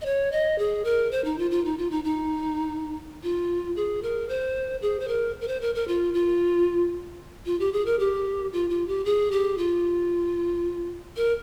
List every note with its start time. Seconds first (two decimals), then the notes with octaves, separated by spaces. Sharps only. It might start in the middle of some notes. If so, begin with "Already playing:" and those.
0.01 D#5
0.05 C#5
0.32 D#5
0.59 G#4
0.85 A#4
1.11 C5
1.25 D#4
1.39 F4
1.51 F4
1.65 D#4
1.78 F4
1.91 D#4
2.04 D#4
3.23 F4
3.76 G#4
4.03 A#4
4.29 C5
4.82 G#4
5.00 C5
5.08 A#4
5.41 A#4
5.48 C5
5.61 A#4
5.75 A#4
5.88 F4
6.14 F4
7.46 F4
7.60 G4
7.73 G#4
7.86 A#4
7.99 G4
8.53 F4
8.70 F4
8.88 G4
9.05 G#4
9.31 G4
9.58 F4
11.17 A#4